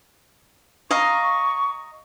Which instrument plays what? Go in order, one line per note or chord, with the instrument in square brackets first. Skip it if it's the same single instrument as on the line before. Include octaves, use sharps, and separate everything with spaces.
[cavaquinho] D#5 F5 A#5 [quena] C#6